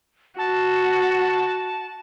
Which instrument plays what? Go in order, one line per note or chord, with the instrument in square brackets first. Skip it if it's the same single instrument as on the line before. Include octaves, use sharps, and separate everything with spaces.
[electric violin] F#4 [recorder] A5